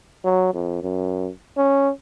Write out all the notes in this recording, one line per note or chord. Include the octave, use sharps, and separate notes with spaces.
F#3
F2
F#2
C#4